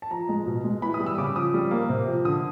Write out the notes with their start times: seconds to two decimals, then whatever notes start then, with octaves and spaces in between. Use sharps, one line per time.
0.02 A5
0.11 F3 A#5
0.29 G#3
0.46 B2
0.64 G#3
0.82 E3 B5
0.94 D#6
1.00 G3
1.06 E6
1.18 C#3 D6
1.35 F3 D#6
1.54 G3
1.71 A#3
1.89 C3
2.07 F3
2.25 D3 D#6